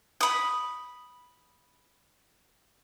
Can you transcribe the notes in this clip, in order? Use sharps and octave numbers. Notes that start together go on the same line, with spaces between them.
B5 D#6